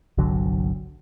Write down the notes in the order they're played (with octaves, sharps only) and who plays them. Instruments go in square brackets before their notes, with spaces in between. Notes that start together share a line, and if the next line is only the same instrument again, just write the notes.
[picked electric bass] G1 C2 D3 F#3